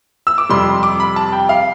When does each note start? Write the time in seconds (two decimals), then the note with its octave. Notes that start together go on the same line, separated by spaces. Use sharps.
0.27 E6
0.38 D6
0.49 F2 C3 G3 C6
0.83 D6
1.00 B5
1.16 A5
1.32 G5
1.49 F5